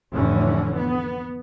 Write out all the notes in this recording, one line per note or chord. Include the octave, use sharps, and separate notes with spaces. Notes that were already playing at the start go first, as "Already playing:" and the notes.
F1 A2 D3 E3 C#4
B3